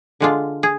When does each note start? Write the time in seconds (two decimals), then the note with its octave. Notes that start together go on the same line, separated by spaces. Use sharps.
0.20 D3 G#3 D4 F4
0.63 G#4